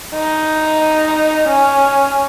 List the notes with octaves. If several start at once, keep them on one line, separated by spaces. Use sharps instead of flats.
D#4
C#4